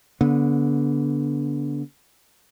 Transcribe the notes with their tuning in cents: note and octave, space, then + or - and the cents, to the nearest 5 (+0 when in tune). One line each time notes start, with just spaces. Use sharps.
D3 -30 B3 -25